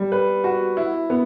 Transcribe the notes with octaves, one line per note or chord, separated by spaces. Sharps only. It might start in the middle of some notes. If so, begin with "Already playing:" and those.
Already playing: G3
B4
F#4
E4
B3